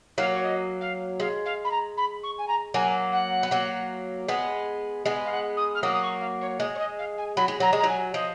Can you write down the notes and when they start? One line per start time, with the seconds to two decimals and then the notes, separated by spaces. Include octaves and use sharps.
0.18 F#3 A#3 F5
0.33 C#5
0.43 D#5
0.81 F5
1.20 G#3 F5
1.46 F5
1.65 B5
1.71 A#5
1.97 B5
2.23 C#6
2.38 G#5
2.48 A#5
2.74 F#3 A#3 G#5
3.12 F#5
3.43 B3
3.51 F#3 A#3
4.28 G#3 B3
5.05 G#3 B3
5.26 F5
5.32 F#5
5.57 D#6
5.75 F6
5.82 F#3 A#3 D#6
5.93 D#6
6.03 C#6
6.21 F5
6.41 C#5
6.60 G#3 D#5
6.75 C#5
6.79 D#5
6.99 F5
7.18 G#5
7.37 F#3 B5
7.48 G#3
7.60 F#3 A#5
7.73 G#3
7.79 F#3 A#5
7.89 G#5
8.14 F3 D#5